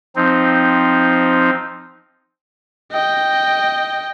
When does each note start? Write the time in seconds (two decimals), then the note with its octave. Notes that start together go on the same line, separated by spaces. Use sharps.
0.16 F3 C4 D#4
2.92 D#5 G5